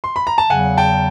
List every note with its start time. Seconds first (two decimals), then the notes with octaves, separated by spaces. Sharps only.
0.04 C6
0.16 B5
0.27 A#5
0.38 A5
0.50 E2 C#3 F#3 F#5 G#5
0.77 G5 A5